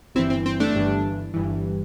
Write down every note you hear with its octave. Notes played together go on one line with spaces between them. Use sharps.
G1 G2 E3 C4 E4
C4
C4
A3 D4
G1 G2 E3
G1 G2 E3